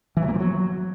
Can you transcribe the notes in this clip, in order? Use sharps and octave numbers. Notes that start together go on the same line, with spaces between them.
E3
F#3
A#3
F3
F#3